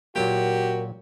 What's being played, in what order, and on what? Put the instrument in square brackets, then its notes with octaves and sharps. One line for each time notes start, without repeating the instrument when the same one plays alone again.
[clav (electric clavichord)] A#2 F#3 A#3 [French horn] F#4 [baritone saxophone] G4 [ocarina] A#4